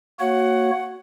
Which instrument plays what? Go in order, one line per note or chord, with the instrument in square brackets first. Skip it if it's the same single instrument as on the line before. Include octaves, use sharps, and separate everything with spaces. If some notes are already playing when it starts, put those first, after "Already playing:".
[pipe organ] A#3 F#4 C#5 [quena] F#5